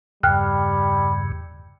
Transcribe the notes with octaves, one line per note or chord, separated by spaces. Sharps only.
E2 G2 C#3 G3 G5 F6 F#6